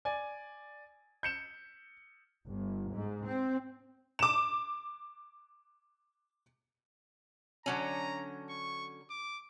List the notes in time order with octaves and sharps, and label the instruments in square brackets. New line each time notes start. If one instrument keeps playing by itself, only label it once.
[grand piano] D5 G#5
G6 C#7 E7
[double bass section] G1
G#2
C4
[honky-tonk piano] D6 E7
[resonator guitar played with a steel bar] D3 F#3 C#4 [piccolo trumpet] A#5
[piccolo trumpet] C#6
D6